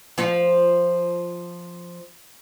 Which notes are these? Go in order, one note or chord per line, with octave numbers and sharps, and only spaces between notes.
F3 F4